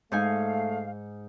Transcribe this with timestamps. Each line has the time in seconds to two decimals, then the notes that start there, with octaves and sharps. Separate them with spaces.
0.12 G#2 A3 D#4 F5 G#5